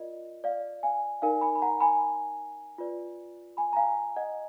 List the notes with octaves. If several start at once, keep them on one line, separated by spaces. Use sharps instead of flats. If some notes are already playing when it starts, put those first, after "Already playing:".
Already playing: F4 A#4 D5 D#5
D5 F5
F5 G#5
D#4 A#4 D5 F5 G#5
G#5 B5
B5
F#5 A#5
G#5 B5
F4 B4 D5
G#5 B5
A#5
F5 G#5
D#5 F#5